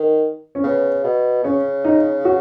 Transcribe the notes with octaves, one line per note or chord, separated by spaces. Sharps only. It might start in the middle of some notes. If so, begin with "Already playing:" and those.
Already playing: D#3
C#4
C#3 B3
B2
C#3 C#4
D#4
F#4